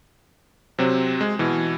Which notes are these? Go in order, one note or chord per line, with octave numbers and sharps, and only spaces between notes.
C3 F#3 C4
G#3
B2 E3